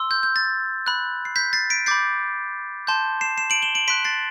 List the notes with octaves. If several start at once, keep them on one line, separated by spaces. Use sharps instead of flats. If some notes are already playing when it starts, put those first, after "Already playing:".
Already playing: C6 E6
G6
G6
A6
B5 F#6
C7
G6 B6
A6 C7
B6 D7
B5 D6 G6 A6 C7
A5 C6 G6
C7 E7
C7 E7
D7 F#7
E7 G7
D7 F#7
C6 F#6 B6 D7
A6 C7